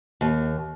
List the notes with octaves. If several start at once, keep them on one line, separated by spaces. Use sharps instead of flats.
D#2